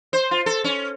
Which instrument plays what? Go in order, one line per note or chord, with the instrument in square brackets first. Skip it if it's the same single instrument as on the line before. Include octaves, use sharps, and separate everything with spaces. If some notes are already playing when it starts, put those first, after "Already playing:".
[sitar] C5
F4
A4
C#4